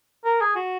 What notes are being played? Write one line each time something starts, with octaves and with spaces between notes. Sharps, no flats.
A#4
G#4
F#4